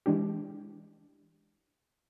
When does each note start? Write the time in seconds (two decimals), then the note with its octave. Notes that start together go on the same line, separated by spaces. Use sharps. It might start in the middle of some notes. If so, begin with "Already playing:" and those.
0.06 E3 G#3 D4 G4